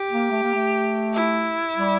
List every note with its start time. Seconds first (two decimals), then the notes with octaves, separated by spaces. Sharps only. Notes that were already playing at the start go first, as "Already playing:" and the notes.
Already playing: G4
0.11 A#3
0.31 A3
0.43 A#3
0.54 A3
1.14 E4
1.76 G3